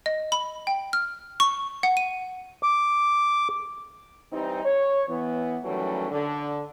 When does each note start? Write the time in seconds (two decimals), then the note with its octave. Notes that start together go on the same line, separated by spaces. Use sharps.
0.06 D#5
0.32 B5
0.67 G5
0.93 F6
1.40 C#6
1.83 F#5
1.97 D#7
2.63 D6
4.32 E3 G3 C4 D#4
4.65 C#5
5.09 E3 B3
5.64 D#3 E3 F#3 G3 A3 C#4
6.11 D3